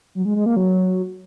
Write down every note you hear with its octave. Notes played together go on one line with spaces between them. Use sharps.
F#3
G#3
G#3
A#3
F#3